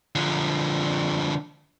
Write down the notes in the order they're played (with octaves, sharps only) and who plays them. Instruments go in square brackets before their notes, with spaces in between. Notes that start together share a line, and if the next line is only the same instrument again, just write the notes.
[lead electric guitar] D3 F3